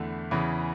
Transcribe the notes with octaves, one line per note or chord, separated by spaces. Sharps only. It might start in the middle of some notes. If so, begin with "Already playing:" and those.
Already playing: E2 D3 A3 E4
E2 C#3 E3